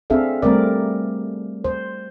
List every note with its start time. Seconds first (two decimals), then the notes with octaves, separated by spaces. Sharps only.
0.10 C4 D4 G#4 A4 E5 F5
0.42 G3 A3 C4 A#4 D5
1.64 C5